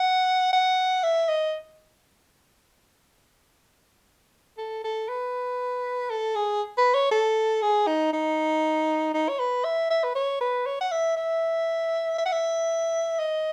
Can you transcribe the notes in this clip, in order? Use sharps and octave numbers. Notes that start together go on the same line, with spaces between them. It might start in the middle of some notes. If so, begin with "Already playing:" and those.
Already playing: F#5
F#5
E5
D#5
A4
A4
B4
A4
G#4
B4
C#5
A4
G#4
D#4
D#4
D#4
C#5
B4
E5
E5
B4
C#5
B4
C#5
F#5
E5
E5
E5
F#5
E5
D#5